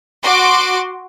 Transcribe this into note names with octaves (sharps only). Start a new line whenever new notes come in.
F#4 C6 D6